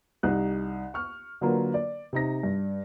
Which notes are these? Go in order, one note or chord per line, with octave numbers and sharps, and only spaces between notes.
C2 D#4 G4 F#6
C#6 F6
D3 F#3 A#3 F4 A#4 B4
D5
C3 D#4 A#6
G2